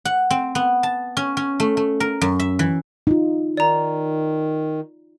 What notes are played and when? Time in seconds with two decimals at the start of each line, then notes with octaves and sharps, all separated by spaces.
0.05 F#5
0.30 C4
0.55 B3
0.83 A5
1.17 C#4
1.37 C#4
1.60 A3
1.77 A3
2.00 A#4
2.21 F#2
2.40 E5
2.59 E3
3.07 D#4 F4
3.57 D#3 D5 A#5